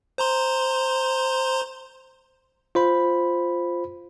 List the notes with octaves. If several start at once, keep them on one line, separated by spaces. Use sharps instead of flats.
C5 A#5 C6
F4 C5 B5